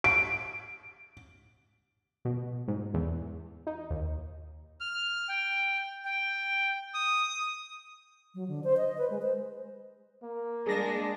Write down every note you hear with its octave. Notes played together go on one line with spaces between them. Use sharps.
D7
B2
G#2
E2
D#4
D#2
F6
G5
G5
D#6
F#3
D3
C5
D#5
B4
G#3
C5
A#3
G#3 D4 G#4 A#6